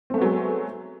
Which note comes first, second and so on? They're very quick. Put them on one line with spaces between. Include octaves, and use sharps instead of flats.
C4 A3 B3 F#3 G#3